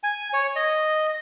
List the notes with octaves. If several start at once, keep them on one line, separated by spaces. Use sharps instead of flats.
G#5
C#5
D#5